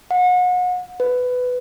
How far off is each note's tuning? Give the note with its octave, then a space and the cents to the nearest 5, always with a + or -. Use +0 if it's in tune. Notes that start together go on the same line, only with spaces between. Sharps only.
F#5 -35
B4 +15